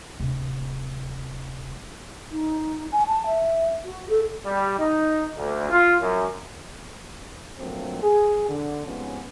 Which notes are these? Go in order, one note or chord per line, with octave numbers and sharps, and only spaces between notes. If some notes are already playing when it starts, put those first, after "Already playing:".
D1 C3
D#4
G#5
A5
E5
F#4
A4
G3
D#4
D2
F4
F#2
D3 F3 F#3 A3 A#3 C4
G#4
D3
G#2 C3 F3 B3 C#4